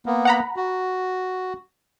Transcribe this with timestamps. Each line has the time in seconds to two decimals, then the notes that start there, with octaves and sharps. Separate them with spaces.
0.06 A#3 B3
0.25 F#5 A#5 B5
0.57 F#4